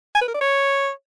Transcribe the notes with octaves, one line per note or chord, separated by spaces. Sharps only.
G#5
B4
A#4
D5
C#5